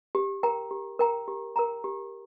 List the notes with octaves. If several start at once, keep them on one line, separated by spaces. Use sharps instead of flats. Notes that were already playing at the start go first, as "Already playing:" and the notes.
G4
A#4 G5 A#5
G4
A#4 G5 A#5
G4
A#4 G5 A#5
G4